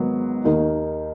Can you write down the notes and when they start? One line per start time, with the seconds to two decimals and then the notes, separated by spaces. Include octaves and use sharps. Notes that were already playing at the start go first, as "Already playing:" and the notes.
Already playing: G#1 G#2 D#3 F#3 B3
0.44 D#2 D#3 A#3 D#4